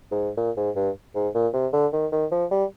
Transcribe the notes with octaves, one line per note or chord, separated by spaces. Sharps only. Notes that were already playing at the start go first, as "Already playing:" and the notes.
G#2
A#2
G#2
G2
G#2
A#2
C3
D3
D#3
D#3
F3
G3